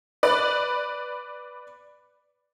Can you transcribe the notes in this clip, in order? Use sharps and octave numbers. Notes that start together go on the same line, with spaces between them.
B4 D5